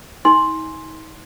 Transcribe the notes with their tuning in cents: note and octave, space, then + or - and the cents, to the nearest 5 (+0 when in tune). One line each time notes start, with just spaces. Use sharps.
D#4 +40 G#5 +0 C6 +5